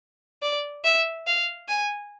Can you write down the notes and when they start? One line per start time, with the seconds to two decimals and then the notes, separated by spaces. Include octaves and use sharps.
0.42 D5
0.84 E5
1.27 F5
1.68 G#5